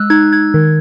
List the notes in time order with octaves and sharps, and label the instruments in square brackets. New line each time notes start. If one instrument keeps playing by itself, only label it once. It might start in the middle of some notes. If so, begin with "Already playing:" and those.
Already playing: [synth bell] G#3 E6 F#6
D#4 G#6
G#6
D#3